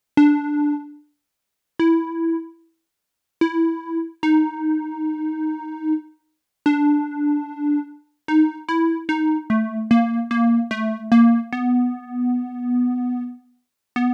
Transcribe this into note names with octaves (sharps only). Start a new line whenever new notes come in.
D4
E4
E4
D#4
D4
D#4
E4
D#4
A3
A#3
A#3
A3
A#3
B3
B3